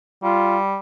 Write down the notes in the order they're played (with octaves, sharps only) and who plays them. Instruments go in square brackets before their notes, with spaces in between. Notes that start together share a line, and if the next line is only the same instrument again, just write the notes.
[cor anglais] G3 [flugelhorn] F4